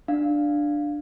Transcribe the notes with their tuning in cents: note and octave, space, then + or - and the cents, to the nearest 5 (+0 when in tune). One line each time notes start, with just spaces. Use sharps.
D4 +5 F5 +0